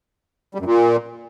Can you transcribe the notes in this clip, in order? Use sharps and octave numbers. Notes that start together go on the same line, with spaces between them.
G3
F#2
A#2